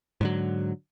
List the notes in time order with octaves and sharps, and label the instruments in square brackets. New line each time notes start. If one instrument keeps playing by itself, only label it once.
[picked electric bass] G#2 D3 F#3